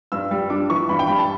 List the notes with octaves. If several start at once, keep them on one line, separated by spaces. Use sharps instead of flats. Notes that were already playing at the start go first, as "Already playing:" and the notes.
G2 E6
G3
D4 D6
E3 C#6
G2 B5
G5
G3 B5
A5